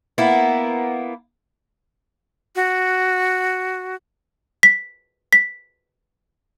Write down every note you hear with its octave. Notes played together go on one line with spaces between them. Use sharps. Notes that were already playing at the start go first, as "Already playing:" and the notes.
A#3 B3 E4
F#4
B6
B6